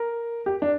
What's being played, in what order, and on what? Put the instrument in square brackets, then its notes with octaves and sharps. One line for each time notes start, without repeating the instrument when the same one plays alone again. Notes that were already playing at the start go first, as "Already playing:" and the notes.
Already playing: [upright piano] A#4
G4
D4